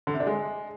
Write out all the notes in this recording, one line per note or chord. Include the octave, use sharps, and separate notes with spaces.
D3
C3
D4
G#3